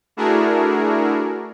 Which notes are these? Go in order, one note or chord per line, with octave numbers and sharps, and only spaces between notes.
A3 D4 E4 F#4 G#4 A#4